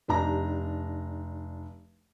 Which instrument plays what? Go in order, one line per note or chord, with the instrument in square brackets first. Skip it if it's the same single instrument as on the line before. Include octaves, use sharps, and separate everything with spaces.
[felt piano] F1 D4 D#4 G4 A#5 A#6